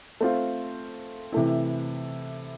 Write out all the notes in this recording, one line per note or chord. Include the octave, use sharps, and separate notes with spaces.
A3 C4 F4
C3 E3 A3 E4